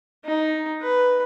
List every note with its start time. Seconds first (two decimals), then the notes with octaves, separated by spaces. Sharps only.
0.25 D#4
0.82 B4